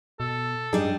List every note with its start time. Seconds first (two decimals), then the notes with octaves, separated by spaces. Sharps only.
0.20 B2 A4
0.73 F#2 G3 D4 D#4 G#4 D#5